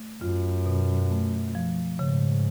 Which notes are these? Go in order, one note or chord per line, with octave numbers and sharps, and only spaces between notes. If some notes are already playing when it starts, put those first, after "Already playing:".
Already playing: A3
F#2 F4
B2
A3
F3
G#2 C#3